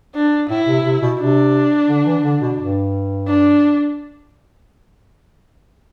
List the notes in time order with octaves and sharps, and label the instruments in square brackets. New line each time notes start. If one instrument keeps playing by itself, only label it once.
[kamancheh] D4
[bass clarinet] A2 [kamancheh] E4
[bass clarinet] C3
C3
B2
[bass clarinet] C3 [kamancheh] D4
[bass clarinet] D3
E3
D3
B2
G2
[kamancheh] D4